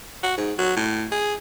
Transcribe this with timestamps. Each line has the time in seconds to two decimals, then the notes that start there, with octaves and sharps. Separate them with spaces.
0.23 F#4
0.37 G#2
0.58 F#3
0.76 A2
1.12 G#4